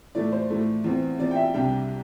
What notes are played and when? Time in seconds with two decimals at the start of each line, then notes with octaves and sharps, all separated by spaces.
0.15 A2 E3 A3 D5
0.32 C5
0.50 A2 E3 A3
0.84 E2 E3 C4
1.18 E2 E3 C4 D5
1.31 G5
1.36 E5
1.54 C2 C3 G3 D4 G5